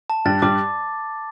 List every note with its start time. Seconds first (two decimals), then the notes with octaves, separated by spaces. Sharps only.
0.10 A5
0.25 G2 G3 A6
0.42 G2 G3 D6